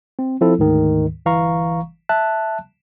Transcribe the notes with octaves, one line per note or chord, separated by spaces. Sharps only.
C4
F3 C4 E4 A4
D2 G#2 D#3
G1 E3 F5 A#5 C#6
E5 A5 F#6